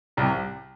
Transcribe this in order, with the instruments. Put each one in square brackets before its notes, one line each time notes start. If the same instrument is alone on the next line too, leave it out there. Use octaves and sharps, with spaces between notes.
[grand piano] C2 C3